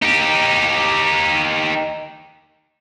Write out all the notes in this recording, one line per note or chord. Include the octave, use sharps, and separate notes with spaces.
D#4 G4